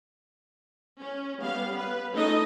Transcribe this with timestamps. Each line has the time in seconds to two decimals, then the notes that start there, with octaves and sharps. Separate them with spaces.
1.01 C#4
1.41 G3 B3 F5
1.77 B4
2.13 A3 C#4 D#4 F4 A4 D#5